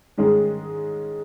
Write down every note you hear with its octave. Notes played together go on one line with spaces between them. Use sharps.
G#2 D#3 G#3 C#4 G#4